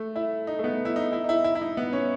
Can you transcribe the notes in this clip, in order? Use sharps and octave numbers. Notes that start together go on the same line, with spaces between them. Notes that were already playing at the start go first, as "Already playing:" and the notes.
Already playing: A3
E4
D#4
A3
B3
E4
D#4
E4
D#4
E4
E4
E4
D#4
B3
C#4